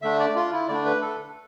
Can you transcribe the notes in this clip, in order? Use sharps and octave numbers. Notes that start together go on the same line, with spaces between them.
D3 A3 D4 E5
D5
F4
E4
D3 A3 D4 D5
B4
A4